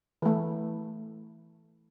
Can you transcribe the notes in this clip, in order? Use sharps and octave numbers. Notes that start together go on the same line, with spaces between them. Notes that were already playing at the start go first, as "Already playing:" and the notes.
E3 A3